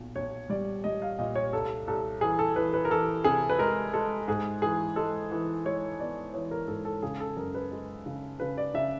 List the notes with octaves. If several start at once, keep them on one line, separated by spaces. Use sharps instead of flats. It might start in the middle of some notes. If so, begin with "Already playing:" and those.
Already playing: B1 A#2
B1 C#5
G3 D5
G3 D#5
F5
A#2 D#5
C#5
C2 A4
C2 A4
E3 G#4
A4
E3 B4
B4
A#4
E3 A4
C3 G#4
B4
G#3 A#4
G#3 A4
G#2 G#4
E3 G#4
G#3 A4
E3
G#3 C#5
B3 D5
E3 C#5
A#4
G#2 A4
A4
C#3 G#4
A4
F#2 A#4
B4
G#3
C#3
C#3 B4
D5
C#3 E5